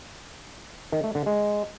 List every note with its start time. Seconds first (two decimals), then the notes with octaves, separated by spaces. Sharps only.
0.92 D#3
1.04 A3
1.15 D3
1.26 G#3